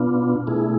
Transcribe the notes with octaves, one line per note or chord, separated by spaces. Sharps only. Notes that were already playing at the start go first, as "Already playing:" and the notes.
Already playing: B2 B3 D4 F4
B2 A3 E4 G#4